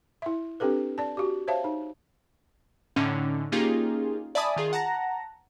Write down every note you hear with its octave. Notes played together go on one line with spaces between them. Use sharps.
E4 E5
C4 D4 G4 A4 B4
D5 A5
F#4 G4
C5 C#5 E5 F5 A5
D#4
A2 D3 C#4 D#4
A#3 C#4 D#4 F4 G4 G#4
D5 E5 G#5 A5 B5 D#6
D#3 F4 G#4
F#5 A5 A#5 A#6